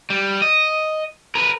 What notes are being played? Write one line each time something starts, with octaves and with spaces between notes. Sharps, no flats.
G3
D#5
A#4 B4